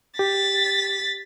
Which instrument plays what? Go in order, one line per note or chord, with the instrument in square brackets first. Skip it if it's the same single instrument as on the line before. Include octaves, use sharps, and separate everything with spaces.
[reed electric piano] G4 [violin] A6 B6